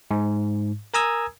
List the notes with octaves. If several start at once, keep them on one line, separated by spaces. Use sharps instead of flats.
G#2
A#4 G#5 A#5 D#6 E6 G#6